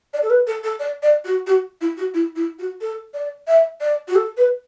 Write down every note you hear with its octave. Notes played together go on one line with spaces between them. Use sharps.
D5
A4
B4
A4
A4
D5
D5
F#4
F#4
E4
F#4
E4
E4
F#4
A4
D5
E5
D5
F#4
A4
B4